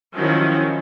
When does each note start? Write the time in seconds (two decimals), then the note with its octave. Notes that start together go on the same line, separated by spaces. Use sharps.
0.15 D#3 F3 F#3 C#4 E4